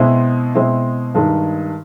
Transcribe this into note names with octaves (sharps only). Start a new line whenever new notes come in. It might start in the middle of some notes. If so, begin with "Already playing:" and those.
Already playing: B2 G#3 C4 E4
B2 G#3 C4 E4
G2 D#3 G#3